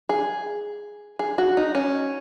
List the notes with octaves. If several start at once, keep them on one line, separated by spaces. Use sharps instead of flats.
G#4
G#4
F#4
D#4
C#4